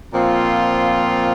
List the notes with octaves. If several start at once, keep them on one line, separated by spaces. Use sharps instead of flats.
A#2 F3 C4 F4